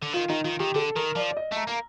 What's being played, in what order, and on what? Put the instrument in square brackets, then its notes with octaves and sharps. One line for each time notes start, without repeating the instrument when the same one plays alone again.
[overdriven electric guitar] D3
[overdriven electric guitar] D#3 [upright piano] F4
[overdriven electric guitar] D#3 [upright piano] D#4
[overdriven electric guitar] D#3 [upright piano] F4
[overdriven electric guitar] D#3 [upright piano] G4
[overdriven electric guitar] D3 [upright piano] A4
[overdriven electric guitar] D#3 [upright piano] A#4
[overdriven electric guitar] F3 [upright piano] D5
[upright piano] D5
D#5
[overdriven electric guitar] A3 [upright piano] A#5
[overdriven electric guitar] A#3 [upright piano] A#5